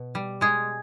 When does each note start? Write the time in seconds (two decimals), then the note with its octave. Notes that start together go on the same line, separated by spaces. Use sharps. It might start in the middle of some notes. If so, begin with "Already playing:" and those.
Already playing: B2
0.15 G3
0.41 G#3 G#4